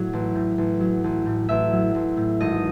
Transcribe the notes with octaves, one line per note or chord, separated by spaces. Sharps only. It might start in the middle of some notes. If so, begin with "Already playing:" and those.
Already playing: A2 F#3 C#5
A1
A2
A1
F#3
A1
A2
A1 E5
F#3
A1
A2
G#1 D#5